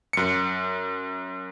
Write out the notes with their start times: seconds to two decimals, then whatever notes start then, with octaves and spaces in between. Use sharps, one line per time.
0.13 F#2 C#7